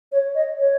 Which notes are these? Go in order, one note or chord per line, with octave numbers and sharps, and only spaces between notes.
C#5
D#5
C#5